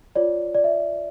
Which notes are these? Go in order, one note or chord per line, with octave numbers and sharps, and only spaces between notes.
F4 C#5 D5
D5
E5